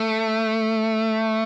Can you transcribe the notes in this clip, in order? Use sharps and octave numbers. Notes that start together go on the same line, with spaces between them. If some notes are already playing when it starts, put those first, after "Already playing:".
Already playing: A3